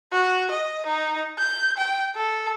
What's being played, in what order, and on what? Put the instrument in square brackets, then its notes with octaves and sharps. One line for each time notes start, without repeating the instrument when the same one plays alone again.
[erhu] F#4
D#5
D#4
G6
G5
A4